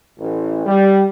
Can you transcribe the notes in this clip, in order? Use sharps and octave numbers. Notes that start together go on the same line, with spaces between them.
A1
G3